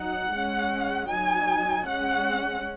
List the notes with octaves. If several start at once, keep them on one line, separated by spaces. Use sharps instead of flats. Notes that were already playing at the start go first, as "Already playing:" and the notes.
Already playing: F#3 D#4 F#5
G#3 C#4
F#3 D#4 G#5
G#3 C#4 F#5